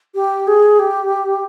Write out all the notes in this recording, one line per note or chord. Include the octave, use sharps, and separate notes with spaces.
G4
G#4
G4